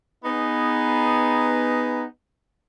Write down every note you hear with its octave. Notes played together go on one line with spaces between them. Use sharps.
B3 D#4 G#4